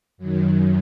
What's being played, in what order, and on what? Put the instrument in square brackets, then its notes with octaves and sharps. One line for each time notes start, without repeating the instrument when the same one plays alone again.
[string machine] F#2 D#3 F#3